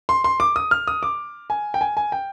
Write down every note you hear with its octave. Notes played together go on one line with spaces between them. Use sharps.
C6
C6
D6
D#6
F6
D#6
D6
G#5
G5
G#5
G#5
G5